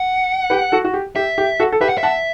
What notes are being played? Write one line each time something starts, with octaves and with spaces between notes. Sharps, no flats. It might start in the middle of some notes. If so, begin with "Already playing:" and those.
Already playing: F#5
G4 B4
F#4 A4
F#4
G4
G4 E5
G4
F#4 A4
A4
G4 B4 E5
F#5
E5
F#5 A5